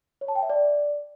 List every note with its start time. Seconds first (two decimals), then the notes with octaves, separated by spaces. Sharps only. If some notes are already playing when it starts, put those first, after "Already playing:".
0.21 C#5
0.28 A5
0.35 G5
0.43 E5
0.50 D5